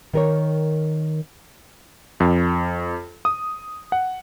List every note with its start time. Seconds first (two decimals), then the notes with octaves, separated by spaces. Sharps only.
0.13 D#3 A#4 C#5
2.20 F2
3.25 D#6
3.92 F#5